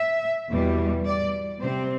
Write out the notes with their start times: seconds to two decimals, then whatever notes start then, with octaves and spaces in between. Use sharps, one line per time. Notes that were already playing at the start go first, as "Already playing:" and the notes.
Already playing: E5
0.49 E2 B2 G3
1.05 D5
1.61 C3 G3 C4 C5